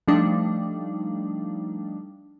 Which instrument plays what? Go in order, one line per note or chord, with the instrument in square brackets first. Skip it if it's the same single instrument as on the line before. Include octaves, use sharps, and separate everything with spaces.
[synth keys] F3 G3 A3 D4 D#4